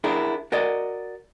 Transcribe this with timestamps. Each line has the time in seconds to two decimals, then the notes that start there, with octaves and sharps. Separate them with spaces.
0.04 D4 E4 G#4 A#4
0.52 F#4 A#4 D5 D#5